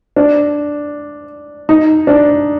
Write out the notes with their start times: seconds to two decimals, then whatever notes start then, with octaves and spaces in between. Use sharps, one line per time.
0.16 D4
1.69 D#4
2.07 D4